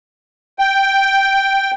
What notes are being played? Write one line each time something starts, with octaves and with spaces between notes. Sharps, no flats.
G5